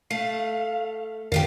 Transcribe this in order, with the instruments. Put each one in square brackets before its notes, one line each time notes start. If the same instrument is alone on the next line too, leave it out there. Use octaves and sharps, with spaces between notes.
[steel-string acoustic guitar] A3 [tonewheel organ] F5
[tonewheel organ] F2 D#3 F5 [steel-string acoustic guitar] D3 A3 G4